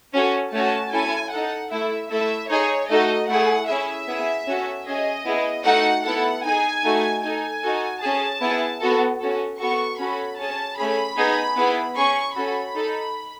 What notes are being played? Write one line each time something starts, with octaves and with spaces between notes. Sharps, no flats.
C#4 F#4 A4
A3 C#4 F#4 A5
C#4 E4 A4 G#5
D#4 A4 F#5
A3 E4 A4 E5
A3 E4 A4 E5
D#4 G#4 C#5
A3 D#4 F#4 A4 D#5
A3 E4 G#4 F#5
C#4 E4 G#4 E5
B3 E4 G#4
C#4 F#4 A4
C#4 G#4 D#5
B3 E4 G#4
A3 D#4 F#4 A4 F#5
B3 E4 A4 F#5
D#4 G#4 G#5
A3 D#4 F#4
D#4 A4 G#5
D#4 F#4 A4
C#4 G#4 A5
B3 E4 G#4
B3 F#4 A4
C#4 F#4 A4
B3 F#4 A4 C#6
C#4 F#4 A4 B5
C#4 G#4 A5
A3 C#4 G#4 B5
B3 D#4 G#4
B3 E4 G#4
C#4 G#4 C#6
C#4 F#4 A4 B5
D#4 A4